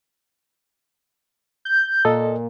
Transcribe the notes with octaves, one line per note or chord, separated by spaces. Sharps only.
G6
A#2 A4 D#5